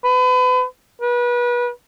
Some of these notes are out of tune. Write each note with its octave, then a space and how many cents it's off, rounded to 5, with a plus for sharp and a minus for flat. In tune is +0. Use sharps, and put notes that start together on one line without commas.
B4 +35
B4 -30